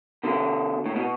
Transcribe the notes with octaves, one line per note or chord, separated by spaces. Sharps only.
B2 D3
A2
B2